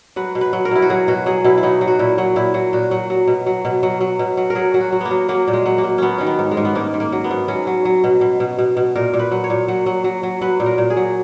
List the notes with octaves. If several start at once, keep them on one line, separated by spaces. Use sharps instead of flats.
F#3 B4
B2
B4
F#3
A#4
B2 E4
F#4
F#3 G#4
B2 F#4
F#3 G#4
B2 E4
E4
F#3 D#4
F#3
F#4
A#2 E4
F#3
A#2 E4
F#3
A#2 F#4
F#3
F#3
B2
F#3
B2
F#3
F#3
B2
F#3
A#4
F#3 G#4
F#3
F#4
F#3
A#3 B3
F#3
F#3 A#3
A#2
G#3
F#3
A#3
F#3
F#3 B3 C#4
D#3 C#4
B3
G#2
G#3
G#2
B3
G#2 A#3
G#2
A#3
F#3
B3
G#2
F#3 C#4
F#3
F#3
B2
B2
B2
B2
B2
A#2 A#4
A#2
B4
F#3
C#5
A#2
F#3
F#3
F#3
F#3
F#3 B4
A#2
A#4
A#2
G#4
F#3